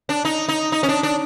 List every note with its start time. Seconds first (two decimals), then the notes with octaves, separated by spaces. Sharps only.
0.09 D4
0.25 D#4
0.49 D#4
0.72 D#4
0.83 C#4
0.89 D4
1.03 D4